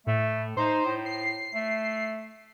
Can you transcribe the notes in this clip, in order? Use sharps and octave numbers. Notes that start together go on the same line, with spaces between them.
A2 A3
D#4 C5
A2
C7
A3